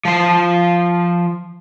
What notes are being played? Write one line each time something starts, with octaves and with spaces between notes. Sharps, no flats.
F3 C5